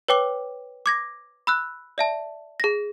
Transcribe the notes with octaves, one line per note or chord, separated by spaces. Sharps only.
B4 C#5 G5 D6 G7
D6 G#6 A#6
B5 E6 F#6
D5 E5 A5
G#4 A#6